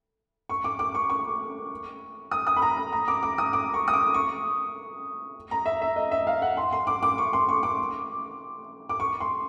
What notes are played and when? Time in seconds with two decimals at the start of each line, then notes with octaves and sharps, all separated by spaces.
0.50 C#6
0.64 D6
0.79 D6
0.95 C#6
1.10 C#6
2.31 D#6
2.47 D#6
2.56 B5
2.62 A#5
2.77 B5
2.93 A#5
3.08 D6
3.23 D6
3.38 D#6
3.53 D6
3.74 C#6
3.88 D#6
3.93 D6
4.14 C#6
5.51 A#5
5.66 E5
5.81 E5
5.96 D#5
6.11 E5
6.27 F5
6.42 F#5
6.57 C6
6.73 C6
6.87 D6
7.03 D6
7.18 C#6
7.33 C6
7.49 C#6
7.63 D6
8.89 D6
9.00 C#6
9.20 C6